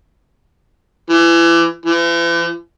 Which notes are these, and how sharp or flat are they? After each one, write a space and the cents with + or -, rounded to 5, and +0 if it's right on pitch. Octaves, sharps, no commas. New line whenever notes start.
E3 +30
E3 +45